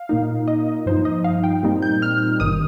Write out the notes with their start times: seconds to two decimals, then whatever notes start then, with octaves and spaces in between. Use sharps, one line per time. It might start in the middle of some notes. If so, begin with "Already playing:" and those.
Already playing: F5
0.09 A#2 A#3 D#4
0.48 D#5
0.86 G2 F3 D#4 C5
1.05 D#5
1.24 F5
1.44 G5
1.63 A#2 G3 C4 D#4
1.82 G6
2.02 F6
2.40 G1 G2 D#3 D#6